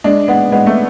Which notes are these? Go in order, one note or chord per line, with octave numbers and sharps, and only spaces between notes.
G#3 D4
G#3 B3
G#3 B3
A3